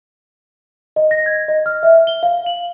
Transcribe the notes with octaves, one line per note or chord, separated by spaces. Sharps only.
D#5
A#6
G#6
D#5
F6
E5
G7
F5
F#7